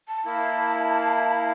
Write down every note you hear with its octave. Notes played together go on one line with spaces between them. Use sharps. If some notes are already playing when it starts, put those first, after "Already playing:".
A5
A#3 E4